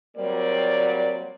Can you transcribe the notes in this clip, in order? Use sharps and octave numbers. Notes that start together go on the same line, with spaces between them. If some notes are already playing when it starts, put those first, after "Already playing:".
F#3 G3 A#3 C4 D5